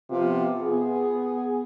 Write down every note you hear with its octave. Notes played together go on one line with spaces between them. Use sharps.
C3 F3 B3 F4
B3 G#4